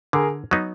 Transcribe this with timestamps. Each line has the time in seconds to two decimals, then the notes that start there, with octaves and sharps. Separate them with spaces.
0.13 D3 G#4 A#4
0.51 F#3 B3 D#4